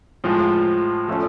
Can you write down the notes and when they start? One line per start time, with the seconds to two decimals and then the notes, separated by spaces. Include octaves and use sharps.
0.24 A2 F3 G#3
1.08 F3 A3 C#4